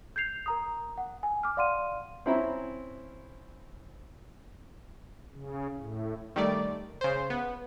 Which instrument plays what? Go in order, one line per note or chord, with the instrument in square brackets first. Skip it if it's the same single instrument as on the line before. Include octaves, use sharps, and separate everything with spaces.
[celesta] G6 G#6 C7 F7
A#4 A#5 D#6
F#5
G#5
D6 F6
D5 F5 F#5 C6 F6 D#7
[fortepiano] C4 C#4 E4 A#5 B5
[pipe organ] C#3
A2
[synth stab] D#3 G3 A3 D5
C#3 C5
B3